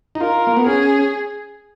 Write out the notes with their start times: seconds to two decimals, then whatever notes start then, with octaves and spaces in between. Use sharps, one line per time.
0.15 D#4
0.20 F4 A#4
0.47 A#3
0.57 B3
0.67 C#4 G#4